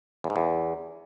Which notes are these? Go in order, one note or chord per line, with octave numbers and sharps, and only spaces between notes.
E2
G#2
E2